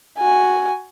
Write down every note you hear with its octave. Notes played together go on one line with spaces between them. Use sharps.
F#4 G#5